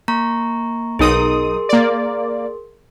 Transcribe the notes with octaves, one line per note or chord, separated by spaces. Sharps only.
A#3 A#5 C#6
B1 D#4 G#4 A#4 C6 D#6
A#3 D5